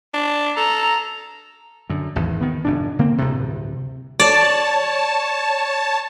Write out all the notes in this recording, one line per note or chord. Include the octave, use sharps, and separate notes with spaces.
D4
A4 A#5
F#2 D3
G#1 E2
D#3 B3
F1 G#2 D4
D3 A#3 C4
D1 G2 C3
C#5 D5 A5